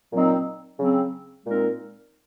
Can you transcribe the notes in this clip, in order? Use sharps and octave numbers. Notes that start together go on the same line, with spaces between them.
A#2 F#3 C4 D#4
C#3 F#3 C4
A#2 G#3 C4 D#4 A#4